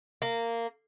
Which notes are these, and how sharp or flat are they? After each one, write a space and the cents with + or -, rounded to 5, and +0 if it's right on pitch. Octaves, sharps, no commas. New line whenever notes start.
A#3 -15